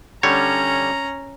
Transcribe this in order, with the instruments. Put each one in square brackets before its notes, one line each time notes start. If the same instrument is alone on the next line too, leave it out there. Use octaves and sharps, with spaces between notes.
[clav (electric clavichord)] D3 G3 C#5 [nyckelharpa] C#4 A#5